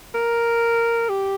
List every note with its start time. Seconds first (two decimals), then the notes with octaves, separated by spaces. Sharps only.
0.14 A#4
1.09 G4